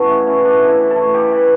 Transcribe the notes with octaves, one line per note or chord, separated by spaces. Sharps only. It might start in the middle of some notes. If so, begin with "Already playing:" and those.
Already playing: E3 A3 B3 C#4 F#4
C#3 E4
E3 C#4
A3 D4
C#3
E4
E3
A4
A3
C#3 G4
E3